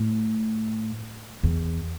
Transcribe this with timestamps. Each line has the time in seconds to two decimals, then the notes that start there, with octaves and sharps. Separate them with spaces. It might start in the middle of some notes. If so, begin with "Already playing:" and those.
Already playing: A2
1.43 E2